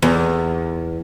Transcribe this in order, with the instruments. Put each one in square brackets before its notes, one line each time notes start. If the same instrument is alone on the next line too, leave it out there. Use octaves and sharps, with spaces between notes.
[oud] E2